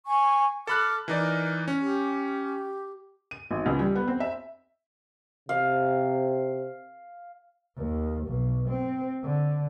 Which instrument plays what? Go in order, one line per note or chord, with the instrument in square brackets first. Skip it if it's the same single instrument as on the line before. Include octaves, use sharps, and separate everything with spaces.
[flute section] G#5 C#6
[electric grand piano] A4 B5 F#6 [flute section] D6 F6
[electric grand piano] E3 D#4 D5 [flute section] A#4
[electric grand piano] C#4
[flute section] G4
[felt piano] D#7
G#1
C#2
G3
B3
C4
E5
[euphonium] C3 [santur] F5
[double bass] D#2
B1
C4
D3